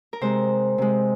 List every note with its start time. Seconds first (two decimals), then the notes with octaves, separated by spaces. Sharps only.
0.13 A#4
0.21 C3 G#3 C5
0.78 C3 G#3